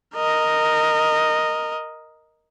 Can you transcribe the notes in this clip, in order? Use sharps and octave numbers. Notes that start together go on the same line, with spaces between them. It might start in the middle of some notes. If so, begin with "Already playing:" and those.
A#4 D#5